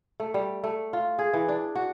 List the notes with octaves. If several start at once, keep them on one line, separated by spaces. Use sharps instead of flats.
A3
G3
A3
F4
G#4
E3
D4
F#4